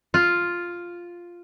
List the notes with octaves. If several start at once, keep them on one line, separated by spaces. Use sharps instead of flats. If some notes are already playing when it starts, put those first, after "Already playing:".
F4